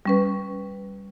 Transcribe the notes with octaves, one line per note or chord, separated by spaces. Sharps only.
G3 C#4 B4